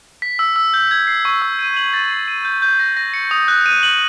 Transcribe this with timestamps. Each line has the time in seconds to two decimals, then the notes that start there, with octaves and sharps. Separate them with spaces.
0.22 B6
0.39 E6
0.56 E6
0.74 G6
0.91 G#6
1.07 C7
1.25 C#6
1.42 E6
1.59 D#7
1.76 F#7
1.93 A6
2.10 C7
2.28 D#7
2.45 G6
2.62 G6
2.80 A#6
2.97 A#6
3.14 C#7
3.31 D#6
3.48 F#6
3.66 D#7
3.83 F#7